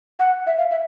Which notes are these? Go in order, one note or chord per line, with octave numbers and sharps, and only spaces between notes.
F#5
E5
F5
E5